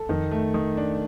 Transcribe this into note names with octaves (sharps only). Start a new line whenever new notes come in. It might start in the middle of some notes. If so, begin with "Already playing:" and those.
Already playing: A4
F2 D#3
A3
D#3
D4